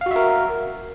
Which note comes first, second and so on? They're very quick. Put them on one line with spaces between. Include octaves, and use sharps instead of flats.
F5 F#4 E5 A#4